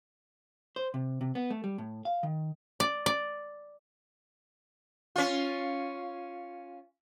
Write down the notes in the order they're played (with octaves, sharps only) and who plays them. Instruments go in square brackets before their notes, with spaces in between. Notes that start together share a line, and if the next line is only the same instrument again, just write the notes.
[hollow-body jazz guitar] C5
C3
C3
B3
A3
G3
A2
F5
D#3
[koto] D5
D5
[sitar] C#4 F4